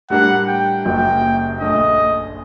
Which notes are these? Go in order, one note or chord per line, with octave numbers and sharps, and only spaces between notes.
A2 G3 D4 G4 A#4 F#5
G5
F#1 F#2 F#3 A#3 G5
A#1 A#2 A3 D4 D#5